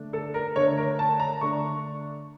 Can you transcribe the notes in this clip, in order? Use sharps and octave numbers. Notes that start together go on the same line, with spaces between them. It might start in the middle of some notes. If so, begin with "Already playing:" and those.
Already playing: D3 A3 D4
A4
A#4
D3 A3 D4 C#5
A#4
A5
A#5
D3 A3 D4 C#6